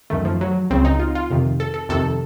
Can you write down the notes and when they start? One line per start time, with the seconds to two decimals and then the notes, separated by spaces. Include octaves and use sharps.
0.10 F#2 D#3 A3
0.25 F3
0.41 F#3
0.70 C#2 C#3 C4
0.85 D#4
0.99 F4
1.15 F4
1.30 F2 C3 D#3
1.60 A4
1.74 A4
1.89 F2 C3 D#3 A4